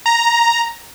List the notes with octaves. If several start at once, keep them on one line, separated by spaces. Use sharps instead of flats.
A#5